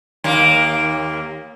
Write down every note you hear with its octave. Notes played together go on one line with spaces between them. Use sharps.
D#2 A#3